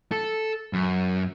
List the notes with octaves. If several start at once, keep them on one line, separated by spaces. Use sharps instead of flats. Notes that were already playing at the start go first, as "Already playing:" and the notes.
A4
F#2